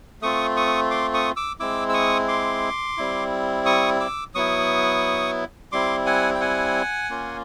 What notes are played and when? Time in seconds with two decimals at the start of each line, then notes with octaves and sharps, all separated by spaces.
0.22 A3 C4 F4 C#6 D#6
0.56 C#6 D#6
0.90 C6 D6
1.14 C#6 D#6
1.36 D6 E6
1.60 G#3 C4 E4 D6 E6
1.89 E6
1.94 C#6 D#6
2.28 C6 D6
2.97 G3 C4 E4
3.66 C#6 D#6
4.00 D6 E6
4.34 F#3 B3 E4 C#6 D#6
5.72 G3 C4 E4 C6 D6
6.06 F#5 G#5
6.35 G5
6.41 F#5 G#5
7.10 A#3 C#4 F4